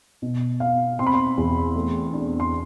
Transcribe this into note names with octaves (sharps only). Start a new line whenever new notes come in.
B2
B3 F5
C4 C6
B5
C6
E2
A3
D4
C6